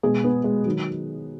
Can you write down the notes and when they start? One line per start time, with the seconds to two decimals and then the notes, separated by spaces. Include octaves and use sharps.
0.03 B2 G#3 G#4
0.24 B3
0.44 G#3
0.66 D#3 F#3